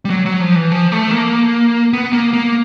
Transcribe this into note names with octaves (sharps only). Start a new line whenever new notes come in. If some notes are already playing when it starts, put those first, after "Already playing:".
G3
F#3
F#3
F3
E3
F3
A3
A#3
B3
A#3
A#3